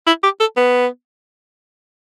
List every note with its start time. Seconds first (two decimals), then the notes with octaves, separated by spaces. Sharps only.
0.07 E4
0.23 G4
0.40 A4
0.57 B3